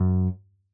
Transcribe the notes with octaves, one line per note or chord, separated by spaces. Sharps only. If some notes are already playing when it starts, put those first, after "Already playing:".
Already playing: F#2